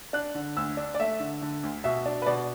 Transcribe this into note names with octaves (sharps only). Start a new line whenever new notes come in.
D4 F#6
D3
D2 E6
D4
D5
A3 E5
D3
D3
D2
B2 E5
D4
B4
B2 D5